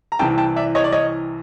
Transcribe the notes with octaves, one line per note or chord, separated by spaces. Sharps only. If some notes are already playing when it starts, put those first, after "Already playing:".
A#5
C2 C3 E3 G5 A5
G5 A5
D5 E5
C#5 D#5
D5
C#5 D#5